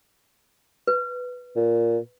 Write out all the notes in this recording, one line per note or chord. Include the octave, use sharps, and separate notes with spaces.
B4
A#2